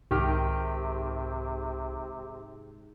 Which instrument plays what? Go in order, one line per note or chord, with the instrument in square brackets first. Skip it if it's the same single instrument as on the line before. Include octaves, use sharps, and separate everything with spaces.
[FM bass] C2 [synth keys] G#2 [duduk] C3 [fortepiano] D#3 G4 F6